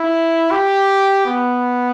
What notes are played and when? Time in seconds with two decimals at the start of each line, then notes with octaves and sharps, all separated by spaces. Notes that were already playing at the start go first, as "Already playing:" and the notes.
Already playing: E4
0.51 G4
1.26 B3